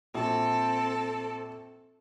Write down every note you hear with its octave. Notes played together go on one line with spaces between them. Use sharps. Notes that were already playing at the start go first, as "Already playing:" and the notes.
A#1 C4 A4